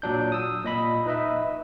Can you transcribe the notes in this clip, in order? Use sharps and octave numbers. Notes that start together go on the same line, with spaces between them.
A#2 F#3 D4 G6
D#6 E6
A#2 D#5 B5
D#4 B4 D#5 E5